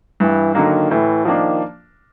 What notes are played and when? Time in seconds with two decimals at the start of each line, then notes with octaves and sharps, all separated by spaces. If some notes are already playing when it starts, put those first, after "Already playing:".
0.20 G2 E3
0.55 D3 D#3 F#3 A#3
0.91 A2 E3
1.25 D#3 F3 A#3 D4